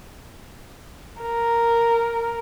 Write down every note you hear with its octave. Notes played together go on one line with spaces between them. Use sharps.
A#4